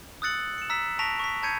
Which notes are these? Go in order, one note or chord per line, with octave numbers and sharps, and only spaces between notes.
D#6 E6 F#6 A6 C#7 F#7
C#7 E7
A#5 E6 B6 E7
A5 C#6 A#6 B6 D7 F7
C#6 B6
A5 B5 G6 G#6 C#7 D#7